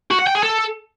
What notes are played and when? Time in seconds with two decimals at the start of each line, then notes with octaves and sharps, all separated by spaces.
0.11 F#4
0.19 F#5
0.27 G5
0.35 G#4
0.43 A4